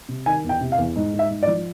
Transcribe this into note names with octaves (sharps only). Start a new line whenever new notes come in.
C3
D#3 G#5
E2
G5
C3
F5
E2
G#2
G#2
E5
G#2
D5
F3